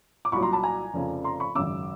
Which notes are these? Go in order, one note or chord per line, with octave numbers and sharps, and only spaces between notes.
D6
C2 A#2 F#3 B5 C#6
A#5 C6
A5 B5
G#5 A#5
F1 F2 C#3
A#5 C6
B5 C#6
G#1 F#2 C#3 D6 E6